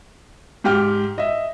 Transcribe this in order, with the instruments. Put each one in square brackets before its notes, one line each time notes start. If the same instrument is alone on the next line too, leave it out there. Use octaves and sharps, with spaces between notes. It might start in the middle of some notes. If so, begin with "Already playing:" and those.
[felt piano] G#2 G4 G5 F6
D#5 E5